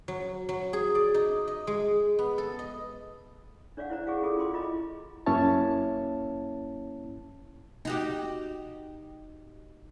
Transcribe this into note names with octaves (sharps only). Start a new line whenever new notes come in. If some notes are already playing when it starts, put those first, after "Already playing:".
F#3
F#3
G#4
D5
D#4
D#5
G#3
B3
A4
D#5
D4 C#5 D5 F5 F#5
E4 C5 A#5
G4 G#4 D5 F5 F#5
C#4 E4 F4 G#4 A4 D6
F4 G5 C6 D6
E4 F4 D#5 A#5 B5 D6
F#2 A#3 C#4 E4 C#5 A5
D#4 F#4 G4